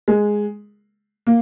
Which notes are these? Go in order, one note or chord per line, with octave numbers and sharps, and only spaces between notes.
G#3
A#3